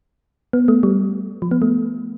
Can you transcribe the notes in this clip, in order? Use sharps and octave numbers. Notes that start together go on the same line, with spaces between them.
B3
A3
G3
F3
B3
A3